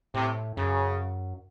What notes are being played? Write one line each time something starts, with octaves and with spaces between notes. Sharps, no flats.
A2 C3
F#2 C#3